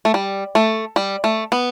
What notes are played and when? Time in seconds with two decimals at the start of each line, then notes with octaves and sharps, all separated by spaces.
0.05 A3
0.14 G3
0.55 A3
0.96 G3
1.24 A3
1.52 B3